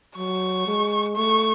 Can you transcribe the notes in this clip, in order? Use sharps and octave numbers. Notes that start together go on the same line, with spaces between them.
F#3 C#6
G#3
A3 C#6